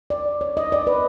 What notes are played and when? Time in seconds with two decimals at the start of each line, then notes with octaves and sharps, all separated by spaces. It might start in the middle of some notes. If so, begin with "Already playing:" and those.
0.10 D5
0.41 C#5
0.57 D#5
0.72 D5
0.87 B4